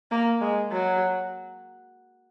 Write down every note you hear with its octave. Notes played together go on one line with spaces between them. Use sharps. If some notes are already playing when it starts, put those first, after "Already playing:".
A#3
G#3
F#3